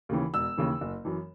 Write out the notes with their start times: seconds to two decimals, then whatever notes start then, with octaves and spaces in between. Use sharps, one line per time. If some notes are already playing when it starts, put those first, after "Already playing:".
0.09 D#2 C#3 E3
0.34 E1 E6
0.57 D#2 C#3 E3
0.81 F#1
1.05 F#2 E3